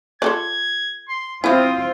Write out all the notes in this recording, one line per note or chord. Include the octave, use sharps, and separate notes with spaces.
F4 A4 D5 G#6
C6
F3 C4 E4 F4 D#6